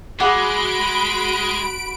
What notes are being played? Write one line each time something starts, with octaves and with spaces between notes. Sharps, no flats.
G#3 F#4 G#4 F#5 B5 D6 D7